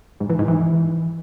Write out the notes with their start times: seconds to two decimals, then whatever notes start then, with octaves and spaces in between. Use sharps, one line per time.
0.20 G#2
0.30 E3
0.39 G#2
0.48 E3